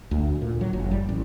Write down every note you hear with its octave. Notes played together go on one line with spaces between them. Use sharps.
D2
A#2
F#3
F#1
G3
A1